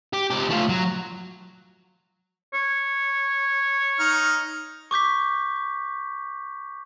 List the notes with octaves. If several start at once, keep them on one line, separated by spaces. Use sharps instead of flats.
G4
C#2 G4
A3 F4
F#3
C#5
D#4 F6
C#6 D6 G6 B6